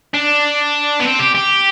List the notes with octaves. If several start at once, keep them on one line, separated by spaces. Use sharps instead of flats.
D4
B3
C4
G4
G4